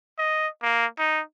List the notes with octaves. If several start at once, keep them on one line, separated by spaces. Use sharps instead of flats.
D#5
A#3
D#4